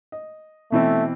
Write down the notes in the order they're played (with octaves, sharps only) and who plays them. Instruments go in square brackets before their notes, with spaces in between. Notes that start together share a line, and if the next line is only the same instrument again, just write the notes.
[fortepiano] D#5
[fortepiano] B2 E3 C4 [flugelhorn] A3